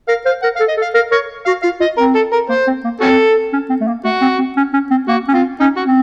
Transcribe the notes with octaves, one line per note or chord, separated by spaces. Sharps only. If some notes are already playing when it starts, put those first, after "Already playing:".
A#4 F5
C5 F5
A#4 F#5
F5
A4
D#5
A4
F5
A#4 F5
A#4 C#5
F#4 F5
F4 F5
F4 D#5
C4 A#4
A4
A#4
A#3 C5
C4
A#3
C4 C#4 F#4 A4
C#4
C4
A3
A#3
A3 F#4
C4
C4
C#4
C#4
C4
A#3 F#4
C#4
C4 F4
C#4 D#4
F#4
C4